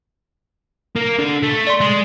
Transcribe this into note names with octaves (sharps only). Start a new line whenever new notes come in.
A#3
D4 A4
A3
D5 C6
G#3